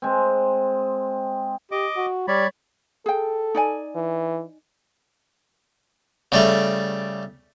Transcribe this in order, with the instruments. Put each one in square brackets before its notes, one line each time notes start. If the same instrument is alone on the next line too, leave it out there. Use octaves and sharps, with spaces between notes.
[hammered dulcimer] G#3 C4
[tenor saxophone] G4 [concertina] D#5 D6
[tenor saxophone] F#4
[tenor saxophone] G3 [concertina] C#5 D5 B5
[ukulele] G#4 G5 [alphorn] A4
[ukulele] D#4 D5 G#5
[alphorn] E3
[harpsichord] C#3 G3 A3